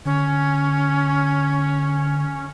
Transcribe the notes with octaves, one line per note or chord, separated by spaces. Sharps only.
D3 C#4